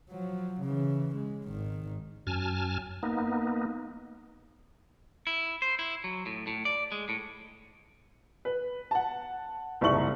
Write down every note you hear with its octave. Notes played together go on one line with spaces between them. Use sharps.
F3 F#3
C#3 E3
G#3
G#1 D#3
F#2 G#5 A5 F6
A#3 B3 D#4
E4
C5
E4
F#3
A2
A2
D5
G#3
A2
B4
F#5 A5
F#1 C2 G#2 E4 C#6 F#7